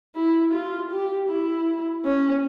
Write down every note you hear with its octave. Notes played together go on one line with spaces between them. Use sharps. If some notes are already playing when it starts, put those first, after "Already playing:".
E4
F4
G4
E4
C#4